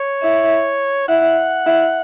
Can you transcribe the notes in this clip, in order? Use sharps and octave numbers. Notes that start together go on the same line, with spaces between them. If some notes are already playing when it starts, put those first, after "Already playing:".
Already playing: C#5
E4
E4 F#5
E4